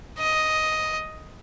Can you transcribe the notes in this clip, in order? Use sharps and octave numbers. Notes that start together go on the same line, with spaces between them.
D#5